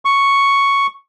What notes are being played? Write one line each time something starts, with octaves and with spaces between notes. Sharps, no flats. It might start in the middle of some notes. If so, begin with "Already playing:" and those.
C#6